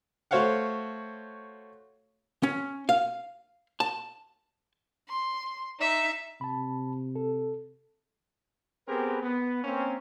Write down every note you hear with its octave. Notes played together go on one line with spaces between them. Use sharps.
A3 F#4 C5 C#5 F5 F#5
C#4
F5
A5
C6
D#4 E5
C3 A5 B5
A4
B3 C4 G4 G#4 A#4 B4
B3
A#3 C4 C#4